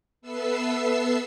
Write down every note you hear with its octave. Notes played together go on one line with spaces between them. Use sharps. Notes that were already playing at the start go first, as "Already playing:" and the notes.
B3 A4 B4 E5 E6 C7